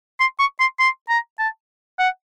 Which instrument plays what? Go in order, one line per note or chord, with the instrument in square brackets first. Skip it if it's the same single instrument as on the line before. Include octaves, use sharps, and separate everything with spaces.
[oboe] C6
C#6
C6
C6
A#5
A5
F#5